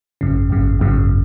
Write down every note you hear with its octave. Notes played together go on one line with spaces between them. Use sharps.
G#1 F#2 C#3
G#1 F#2 C#3
G#1 F#2 C#3